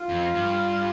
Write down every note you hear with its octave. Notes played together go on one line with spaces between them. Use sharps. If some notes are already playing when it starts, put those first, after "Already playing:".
Already playing: F4
F2
G2